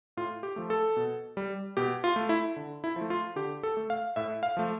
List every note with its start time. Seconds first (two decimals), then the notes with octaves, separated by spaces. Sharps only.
0.17 A2 F4
0.43 G4
0.56 F3 A3
0.70 A4
0.97 B2
1.37 G3
1.77 B2 G4
2.04 F4
2.16 A3
2.29 E4
2.56 D3
2.84 E4
2.96 F3 A3
3.10 F4
3.36 D3 G4
3.63 A4
3.77 A3
3.90 F5
4.16 A2 E5
4.43 F5
4.57 F3 A3